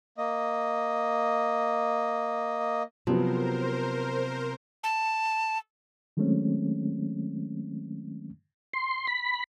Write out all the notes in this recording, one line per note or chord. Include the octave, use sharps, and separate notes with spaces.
A#3 D#5
C3 F3 F#3 B3 A#4 C5
A5
D#3 F#3 G#3 A3 C4 C#4
C6
B5